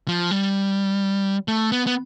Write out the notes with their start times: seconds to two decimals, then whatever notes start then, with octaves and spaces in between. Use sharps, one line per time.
0.08 F3
0.31 G3
1.48 A3
1.72 B3
1.87 B3